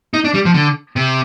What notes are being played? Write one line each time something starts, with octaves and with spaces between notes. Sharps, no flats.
D#4
D4
G3
F3
D3
C3